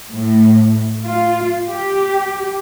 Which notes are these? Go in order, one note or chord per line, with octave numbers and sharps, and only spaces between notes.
A2
F4
G4